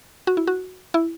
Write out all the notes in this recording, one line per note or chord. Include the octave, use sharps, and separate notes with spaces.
F#4
E4
F#4
E4